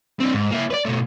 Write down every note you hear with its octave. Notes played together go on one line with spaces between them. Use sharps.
C4 D4
G#2
A#3 E4
B4 D5
B2 A3